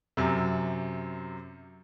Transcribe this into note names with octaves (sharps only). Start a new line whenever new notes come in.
F#2 C3